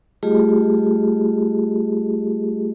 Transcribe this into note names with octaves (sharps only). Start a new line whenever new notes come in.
G3 A3 F4 G4 G#4 D#5